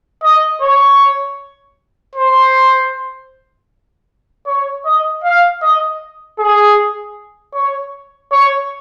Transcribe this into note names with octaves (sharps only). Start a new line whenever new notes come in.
D#5
C#5
C5
C#5
D#5
F5
D#5
G#4
C#5
C#5